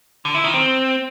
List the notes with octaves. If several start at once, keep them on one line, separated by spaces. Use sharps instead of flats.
D3
E4
D#3
C4